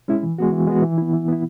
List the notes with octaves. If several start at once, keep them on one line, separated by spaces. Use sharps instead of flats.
G#3 C#4 E4
E3
G#3 B3 F#4
E3
G#3 B3 F#4
E3
B3 E4
E3
B3 E4